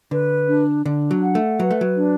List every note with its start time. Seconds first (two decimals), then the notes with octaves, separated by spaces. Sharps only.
0.11 D3 B4
0.48 D4
0.86 D3 D4
1.11 F#3
1.23 F#5
1.35 A3
1.59 F#3 B4
1.71 A3
1.81 F#3
1.96 D4